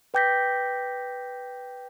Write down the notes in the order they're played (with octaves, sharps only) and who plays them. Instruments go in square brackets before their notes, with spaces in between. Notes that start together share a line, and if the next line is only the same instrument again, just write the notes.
[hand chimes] B4 G5 D6 G6 A#6 B6